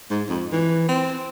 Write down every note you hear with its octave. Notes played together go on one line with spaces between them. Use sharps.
G#2
F2
E3
C4